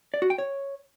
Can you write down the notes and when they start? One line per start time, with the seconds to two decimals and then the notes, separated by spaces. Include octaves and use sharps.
0.14 D5
0.22 F#4
0.30 G5
0.38 C#5